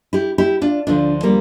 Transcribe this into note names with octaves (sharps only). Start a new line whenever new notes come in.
E4 G4
E4 G4
D4 F4
D2 D3 F3 D4 F4
G3 A#3